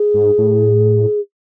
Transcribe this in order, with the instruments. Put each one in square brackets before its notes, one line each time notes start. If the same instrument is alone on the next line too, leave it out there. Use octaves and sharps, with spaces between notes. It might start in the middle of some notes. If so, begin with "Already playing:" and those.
Already playing: [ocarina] G#4
[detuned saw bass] G#2
A2